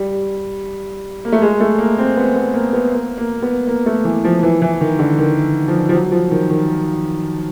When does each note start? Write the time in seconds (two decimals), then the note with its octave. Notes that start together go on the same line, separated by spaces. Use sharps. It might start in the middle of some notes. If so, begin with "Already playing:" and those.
Already playing: G3
1.25 A#3
1.32 A3
1.42 G#3
1.60 A3
1.79 A#3
1.98 C4
2.17 B3
2.36 B3
2.54 A#3
2.73 B3
2.92 A#3
3.18 A#3
3.42 B3
3.67 A#3
3.86 A3
4.05 E3
4.24 F3
4.43 E3
4.62 E3
4.81 D#3
4.99 D3
5.19 D#3
5.68 F3
5.89 F3
5.94 F#3
6.12 F3
6.31 D#3
6.50 D#3